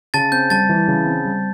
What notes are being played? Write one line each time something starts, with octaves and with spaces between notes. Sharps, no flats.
C#3 A5 A6
C4 G6
G3 A5 A6
E3
C#3
C4
G3